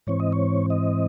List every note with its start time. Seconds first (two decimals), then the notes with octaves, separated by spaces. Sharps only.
0.07 G#2 E3 C4 C#5
0.20 D#5
0.32 C#5
0.70 D#5